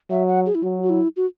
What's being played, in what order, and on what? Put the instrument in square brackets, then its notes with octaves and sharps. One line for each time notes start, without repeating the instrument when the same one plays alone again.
[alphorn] F#3 [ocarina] E5
[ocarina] F#5
G#4
E4
[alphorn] F#3 [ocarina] F#4
[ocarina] F#4
E4
F#4